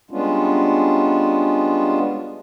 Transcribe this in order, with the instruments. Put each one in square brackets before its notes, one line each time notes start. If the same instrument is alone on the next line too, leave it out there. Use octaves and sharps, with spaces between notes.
[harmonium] G3 G#3 B3 C#4 D4 F4